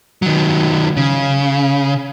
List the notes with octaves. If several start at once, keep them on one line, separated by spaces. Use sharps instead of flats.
D#3 F#3
C#3